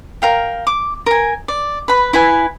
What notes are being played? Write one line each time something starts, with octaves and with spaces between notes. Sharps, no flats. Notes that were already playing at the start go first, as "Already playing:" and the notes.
A#4 F5 G5
D6
A#4 G#5
D5
B4 B5
E4 B4 G#5